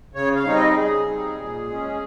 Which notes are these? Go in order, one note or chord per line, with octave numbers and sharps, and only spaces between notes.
C#3 C#5
F5
G3 C4 D#4 C#5
D#5
C#3 G#4
G3 C4 D#4
A#2
G#3 C#4